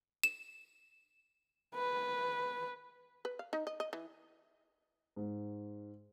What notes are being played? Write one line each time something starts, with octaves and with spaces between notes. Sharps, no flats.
E7
B4
B4
F5
D#4
D#5
D#5
E3
G#2